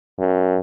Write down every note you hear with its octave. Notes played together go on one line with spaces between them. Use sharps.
F#2